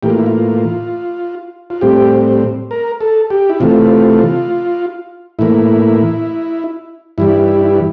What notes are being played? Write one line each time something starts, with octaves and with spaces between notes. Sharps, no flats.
A2 E3 A#3 G4
F4
E4
F4
F4
A2 G3 C4 G4
A#4
A4
G4
E4
C3 E3 A3 F4
A2 E3 A#3 E4
G2 E3 G3 E4
E4
E4